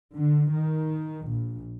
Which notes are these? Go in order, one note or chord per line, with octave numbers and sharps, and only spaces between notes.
D3
D#3
A#1